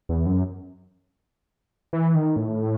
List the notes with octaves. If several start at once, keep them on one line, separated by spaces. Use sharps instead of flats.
E2
F#2
E3
D#3
A2